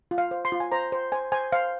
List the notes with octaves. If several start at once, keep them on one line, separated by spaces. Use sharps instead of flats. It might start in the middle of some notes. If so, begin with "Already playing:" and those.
F4
F5
C5
C6
F4
G#5
C5 A#5
C5
C5 G#5
C5 G#5
C5 F5